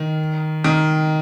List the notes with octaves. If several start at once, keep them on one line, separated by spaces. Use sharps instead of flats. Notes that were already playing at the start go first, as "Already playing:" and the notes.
Already playing: D#3
D#3